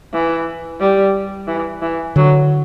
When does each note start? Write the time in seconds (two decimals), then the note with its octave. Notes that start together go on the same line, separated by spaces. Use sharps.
0.13 E3
0.80 G3
1.48 E3
1.82 E3
2.16 D3 F#3